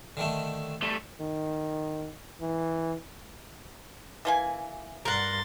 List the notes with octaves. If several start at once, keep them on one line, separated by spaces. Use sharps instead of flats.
D3 D#3 A3
G3 A3
D#3
E3
E3 A#3 G#5
G2 A#4 F#5 C6 A6